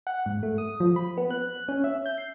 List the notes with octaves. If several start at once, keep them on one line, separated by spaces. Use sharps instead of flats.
F#5
G#2
A3
D#6
F3
B5
B3
F#6
C#4
E5
G6
C7